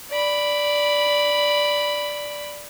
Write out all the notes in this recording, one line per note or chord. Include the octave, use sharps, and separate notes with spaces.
D5 B5